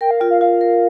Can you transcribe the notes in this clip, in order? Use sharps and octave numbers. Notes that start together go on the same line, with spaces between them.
A#4 G5
F5
F4 G5
F5
F4 F5
A#4